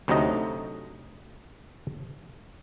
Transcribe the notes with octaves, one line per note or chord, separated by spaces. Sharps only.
D2 C3 F#3 A3 D#4 D#5